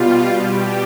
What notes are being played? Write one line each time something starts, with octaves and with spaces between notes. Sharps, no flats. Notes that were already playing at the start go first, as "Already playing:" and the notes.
Already playing: B2 G3 F4
G4